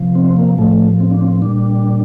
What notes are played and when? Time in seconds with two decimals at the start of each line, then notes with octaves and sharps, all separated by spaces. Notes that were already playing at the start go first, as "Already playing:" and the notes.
Already playing: C3 F3
0.15 C4
0.36 A#3
0.58 A2 F3 A3
1.00 C4
1.11 D4
1.21 C4
1.42 A#2 G3 D4